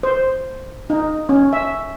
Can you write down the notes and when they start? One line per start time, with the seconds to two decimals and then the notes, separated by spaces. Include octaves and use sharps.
0.03 C5
0.90 D#4
1.29 C#4
1.53 E5